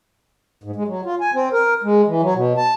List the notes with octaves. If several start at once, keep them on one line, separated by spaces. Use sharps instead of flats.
G#2
G#3
F#3
F4
G#5
C4
A#4
G#3
E3
F#3
B2
A5